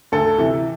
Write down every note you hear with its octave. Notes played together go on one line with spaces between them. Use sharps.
D2 A4
C3 E3